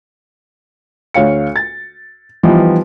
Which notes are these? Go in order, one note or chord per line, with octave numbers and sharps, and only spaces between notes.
D2 C#5 F5 C#7
A6
E3 F3 G3 B3 D#4